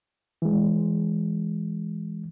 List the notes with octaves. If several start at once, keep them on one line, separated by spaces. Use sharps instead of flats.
E3 G#3